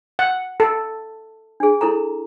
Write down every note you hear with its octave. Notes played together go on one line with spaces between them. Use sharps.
F#5
A4
D4 G#4
E4 A4 A#5